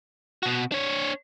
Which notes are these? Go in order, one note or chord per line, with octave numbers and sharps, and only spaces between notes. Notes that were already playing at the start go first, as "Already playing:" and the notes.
B2 F#4
D4 C#5